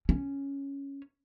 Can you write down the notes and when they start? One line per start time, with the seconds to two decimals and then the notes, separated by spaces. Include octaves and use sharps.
0.09 C#4